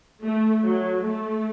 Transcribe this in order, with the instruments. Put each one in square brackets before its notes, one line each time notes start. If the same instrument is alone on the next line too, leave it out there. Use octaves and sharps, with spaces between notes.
[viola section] A3
F#3
A3